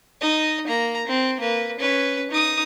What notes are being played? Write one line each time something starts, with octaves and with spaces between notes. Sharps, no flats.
D#4 D#5
A#3 A#5
C4
A#3 B4
C#4 B4
D#4 D#6